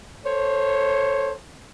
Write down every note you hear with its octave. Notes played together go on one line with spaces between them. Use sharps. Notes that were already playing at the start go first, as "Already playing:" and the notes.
A4 C5 C#5